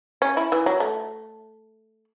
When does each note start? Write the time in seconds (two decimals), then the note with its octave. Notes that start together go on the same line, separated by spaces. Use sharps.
0.22 C#4
0.37 E4
0.52 E3
0.66 F#3
0.80 A3